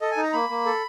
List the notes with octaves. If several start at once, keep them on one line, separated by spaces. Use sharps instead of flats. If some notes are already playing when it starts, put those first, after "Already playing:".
A4 D#5
G#5
D#4
A#5
A#3 B5
A#3
A4